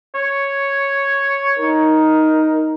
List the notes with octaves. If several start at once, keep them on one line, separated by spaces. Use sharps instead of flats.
C#5
D#4 A#4